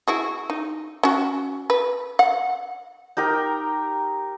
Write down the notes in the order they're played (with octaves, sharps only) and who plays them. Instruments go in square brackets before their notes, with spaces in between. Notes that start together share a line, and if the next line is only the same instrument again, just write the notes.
[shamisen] E4 F#4 G#4
D#4
C#4 F#4
B4
F#5
[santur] D#4 G4 A#4 G5